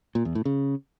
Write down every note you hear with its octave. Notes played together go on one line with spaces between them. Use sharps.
A#2
E2
A2
C#3